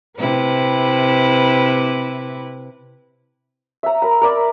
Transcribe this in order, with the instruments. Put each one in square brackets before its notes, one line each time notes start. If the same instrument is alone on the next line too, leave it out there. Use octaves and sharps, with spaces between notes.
[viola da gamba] C3 E4 B4
[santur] E5 A#5
A#4 B5
A#4 D5 B5